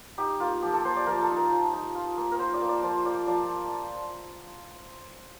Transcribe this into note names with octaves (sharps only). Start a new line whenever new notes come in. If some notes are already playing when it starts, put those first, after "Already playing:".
D#4 G4
A#3 F4
F3 G4
A4
A#3 C5
D5
F3 A#4
A4
D#4
A#4
F3
D#4
F4
A#3
A#4
F4 C5
D5
A#3
D5
F3 C5
F4 D5
F3 D5